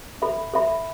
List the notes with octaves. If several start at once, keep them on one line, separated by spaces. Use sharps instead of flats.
A4 E5 B5
A4 E5 B5